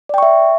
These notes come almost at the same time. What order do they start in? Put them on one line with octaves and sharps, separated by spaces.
D5 G5 C#6 E5